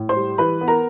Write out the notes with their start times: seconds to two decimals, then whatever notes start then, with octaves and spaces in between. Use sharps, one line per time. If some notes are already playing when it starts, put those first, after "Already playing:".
Already playing: A2
0.09 C5 C6
0.16 G3
0.38 E3 B4 B5
0.61 B3
0.68 A#4 A#5